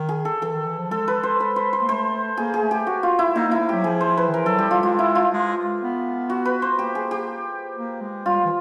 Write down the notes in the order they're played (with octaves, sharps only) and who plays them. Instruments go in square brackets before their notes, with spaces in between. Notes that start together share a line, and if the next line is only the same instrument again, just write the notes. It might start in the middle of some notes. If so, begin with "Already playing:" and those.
Already playing: [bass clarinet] D#3
[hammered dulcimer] G#4
A4
[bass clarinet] E3 [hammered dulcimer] A4
[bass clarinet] D#3
E3
F3
[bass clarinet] G#3 [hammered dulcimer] A4
[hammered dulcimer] B4
C5
B4
C5
C5
[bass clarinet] A#3
[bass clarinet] A3 [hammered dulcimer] C5
[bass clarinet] A#3 [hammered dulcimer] G#4
[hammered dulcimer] G#4
[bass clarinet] A3
[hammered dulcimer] G4
F#4
F4
E4
[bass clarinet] A#3 [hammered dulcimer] D#4
[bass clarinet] A#3
[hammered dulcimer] E4
[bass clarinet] A#3
[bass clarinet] F#3 [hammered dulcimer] G4
[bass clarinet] F3 [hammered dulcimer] G#4
[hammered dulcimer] C5
B4
[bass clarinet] D#3
[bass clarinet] E3 [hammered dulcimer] A#4
[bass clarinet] F#3 [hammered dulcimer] A4
[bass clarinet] G3 [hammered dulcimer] G4
[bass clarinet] G3 [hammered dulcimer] F4
[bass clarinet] G#3 [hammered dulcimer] F4
[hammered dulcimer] E4
F4
[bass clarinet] G#3
B3
[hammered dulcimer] F#4
B4
C5
[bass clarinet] A#3 [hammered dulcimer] G4
[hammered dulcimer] G#4
G4
[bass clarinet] A#3
G#3
[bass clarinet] G3 [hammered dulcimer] F4
[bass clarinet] E3